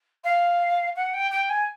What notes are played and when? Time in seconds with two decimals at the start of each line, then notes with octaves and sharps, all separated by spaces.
0.24 F5
0.95 F#5
1.13 G5
1.31 G5
1.49 G#5